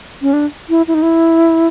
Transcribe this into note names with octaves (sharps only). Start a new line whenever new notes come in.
C#4
D4
E4
E4
D#4
E4